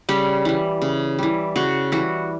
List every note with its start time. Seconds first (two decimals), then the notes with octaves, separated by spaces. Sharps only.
0.09 C#3 G3 G4
0.45 E3 G3
0.82 C#3
1.19 E3 G3
1.56 C#3 F#4
1.92 E3 G3 F#4